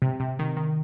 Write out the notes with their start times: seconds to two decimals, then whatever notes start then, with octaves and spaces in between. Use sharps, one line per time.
0.02 C3
0.20 C3
0.39 D#3
0.57 D#3